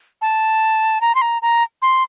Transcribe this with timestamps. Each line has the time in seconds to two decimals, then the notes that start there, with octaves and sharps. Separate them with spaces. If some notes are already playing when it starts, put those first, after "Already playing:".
0.22 A5
1.01 A#5
1.15 C6
1.21 A#5
1.42 A#5
1.82 C6